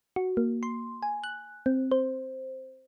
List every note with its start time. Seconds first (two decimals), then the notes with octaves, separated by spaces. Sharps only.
0.16 F#4
0.37 A#3
0.63 C6
1.03 G#5
1.24 F#6
1.66 C4
1.91 C5